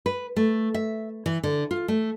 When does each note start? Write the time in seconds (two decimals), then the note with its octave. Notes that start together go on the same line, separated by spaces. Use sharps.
0.06 B4
0.36 A3
0.74 E5
1.26 E3
1.43 D3
1.71 F4
1.88 A3